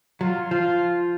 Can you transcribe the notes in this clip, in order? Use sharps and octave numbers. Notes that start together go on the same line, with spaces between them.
F#3 F4
F3 F4